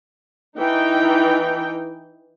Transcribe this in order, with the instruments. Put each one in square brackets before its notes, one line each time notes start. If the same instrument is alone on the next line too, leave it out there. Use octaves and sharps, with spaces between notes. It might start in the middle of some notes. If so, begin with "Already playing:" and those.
[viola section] E3 D#4 G5